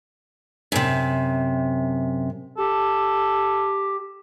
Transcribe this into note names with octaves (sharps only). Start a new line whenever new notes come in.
F#2 C3
G4 A4